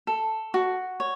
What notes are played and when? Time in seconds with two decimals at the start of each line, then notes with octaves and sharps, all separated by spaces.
0.07 A4
0.54 F#4
1.00 C#5